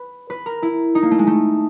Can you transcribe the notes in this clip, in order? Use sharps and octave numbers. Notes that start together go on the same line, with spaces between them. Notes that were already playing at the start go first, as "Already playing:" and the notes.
Already playing: B4
B4
A#4
E4
D#4
A#3
A3
G#3
A3